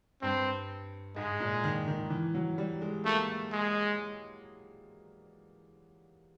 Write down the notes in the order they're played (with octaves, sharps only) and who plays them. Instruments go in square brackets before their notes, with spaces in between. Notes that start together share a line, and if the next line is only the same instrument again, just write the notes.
[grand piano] G2 [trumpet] C4
[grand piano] G#2 [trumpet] G#3
[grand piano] A#2
D#3
D#3
E3
F#3
G3
G#3
[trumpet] A3 [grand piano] A#3
[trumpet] G#3